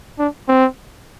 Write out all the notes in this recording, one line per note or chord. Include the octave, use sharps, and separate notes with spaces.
D4
C4